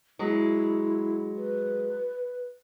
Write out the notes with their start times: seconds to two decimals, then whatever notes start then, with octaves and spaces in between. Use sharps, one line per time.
0.19 F#3 G#3 E4
1.36 B4